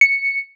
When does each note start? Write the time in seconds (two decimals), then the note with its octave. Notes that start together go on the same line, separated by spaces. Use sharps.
0.01 C#7